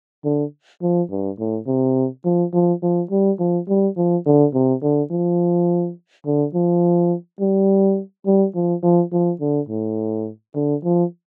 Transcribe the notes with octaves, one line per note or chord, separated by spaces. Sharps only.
D3
F3
G2
A2
C3
F3
F3
F3
G3
F3
G3
F3
D3
C3
D3
F3
D3
F3
G3
G3
F3
F3
F3
D3
A2
D3
F3